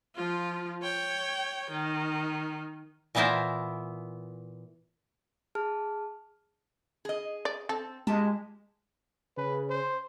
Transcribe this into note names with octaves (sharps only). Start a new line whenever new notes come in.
F3 F4
C#5 G5
D#3
A#2 E3 B3 E4 A#4 C5
G#4 A5 F6
G#4 D#5
D5
C4 A4
A#2 G#3 G4 A5
C#3 B4
C5